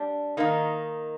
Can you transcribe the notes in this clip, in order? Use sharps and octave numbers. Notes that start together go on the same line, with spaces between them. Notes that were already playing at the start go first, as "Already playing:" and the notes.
Already playing: G3 D4
D#3 A#3 D#4